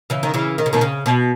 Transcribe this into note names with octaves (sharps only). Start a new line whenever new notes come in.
C#3 E3
D#3
C#3 E3
D#3
C#3
B2 D#3
C#3
B2